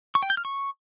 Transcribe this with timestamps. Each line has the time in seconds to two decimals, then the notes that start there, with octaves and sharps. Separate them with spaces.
0.15 C#6
0.23 G5
0.30 G6
0.37 F6
0.45 C#6